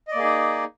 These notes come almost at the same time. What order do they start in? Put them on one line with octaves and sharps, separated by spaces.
D#5 D5 A#3 G#4 D#4